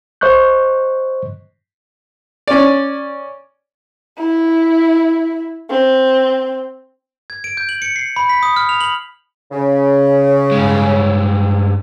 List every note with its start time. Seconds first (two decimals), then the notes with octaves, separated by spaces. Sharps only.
0.21 C5 D#5 C#6 F#6 G6
2.47 C#4 D5
4.18 E4
5.70 C4
7.30 G#6
7.44 D7
7.57 G6
7.69 F#7
7.82 C#7
7.96 C7
8.16 B5
8.29 B6
8.43 D#6
8.56 F6
8.69 F7
8.81 F#7
9.52 C#3
10.51 G2 G#3